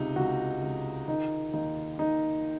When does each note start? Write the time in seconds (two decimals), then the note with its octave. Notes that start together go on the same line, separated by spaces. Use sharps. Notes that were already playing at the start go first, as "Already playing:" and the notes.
Already playing: C#2 C3 D#4
0.16 C#2 F#4
0.62 C#2
1.08 D#3 D#4
1.53 D#2 D#4
1.99 D#3 D#4